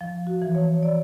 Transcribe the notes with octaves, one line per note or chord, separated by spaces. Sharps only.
F3
F#4
E3
C#5
D5